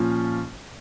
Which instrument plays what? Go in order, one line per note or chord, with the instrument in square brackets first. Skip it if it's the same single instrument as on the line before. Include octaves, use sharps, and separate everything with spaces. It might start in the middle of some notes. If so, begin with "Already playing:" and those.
Already playing: [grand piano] A#2 F3 C#4